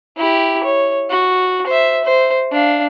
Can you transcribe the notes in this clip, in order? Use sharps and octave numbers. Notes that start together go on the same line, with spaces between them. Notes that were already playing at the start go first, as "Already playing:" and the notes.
E4 G4
C#5
F#4
C5 E5
C5
D4 F5